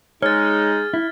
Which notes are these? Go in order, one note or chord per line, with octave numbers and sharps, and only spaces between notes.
G#3 D#4 G#4 C#5 F6 A6
E4